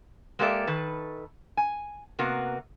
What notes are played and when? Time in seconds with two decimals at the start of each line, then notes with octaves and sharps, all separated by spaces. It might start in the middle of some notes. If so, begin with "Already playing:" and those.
0.39 G#3 A#3 G4 A4 D5 E5
0.67 D#3 A4 B4
1.57 G#5
2.19 C3 A#3 B3 F#4